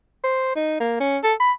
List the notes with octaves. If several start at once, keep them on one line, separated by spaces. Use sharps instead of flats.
C5
D#4
A#3
C#4
A4
B5